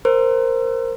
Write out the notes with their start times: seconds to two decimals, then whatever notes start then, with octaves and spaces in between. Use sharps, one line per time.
0.05 A#4 C5